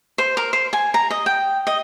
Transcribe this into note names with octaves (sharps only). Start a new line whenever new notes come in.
C5
A#4
C5
G#5
A#5
D#5
G5
D#5